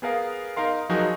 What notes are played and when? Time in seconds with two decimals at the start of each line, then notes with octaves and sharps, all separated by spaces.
0.02 B3 G#4 A#4 F5
0.57 D#4 A#4 F5 C6
0.89 F3 F#3 D#4 F#4 G#4 A#4